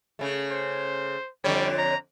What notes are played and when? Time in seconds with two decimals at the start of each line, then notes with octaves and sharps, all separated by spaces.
0.19 C#3 A3
0.51 C5
1.44 F2 D3 G3 C#5
1.78 A#5